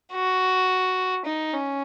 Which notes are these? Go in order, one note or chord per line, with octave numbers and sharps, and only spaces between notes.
F#4
D#4
C#4